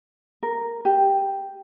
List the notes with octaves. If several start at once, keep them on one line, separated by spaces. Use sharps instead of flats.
A#4
G4